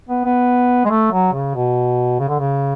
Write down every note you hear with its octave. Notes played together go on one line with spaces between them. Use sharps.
B3
B3
G#3
A3
F#3
C#3
B2
C#3
D3
C#3